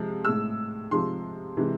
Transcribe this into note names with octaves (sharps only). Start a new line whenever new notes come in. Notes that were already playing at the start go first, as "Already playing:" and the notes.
Already playing: C3 F3 G#3
A2 G#3 E6
C3 F3 G#3 C6
C3 E3 G#3